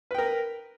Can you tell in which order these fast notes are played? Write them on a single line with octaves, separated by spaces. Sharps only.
B4 G5 A#4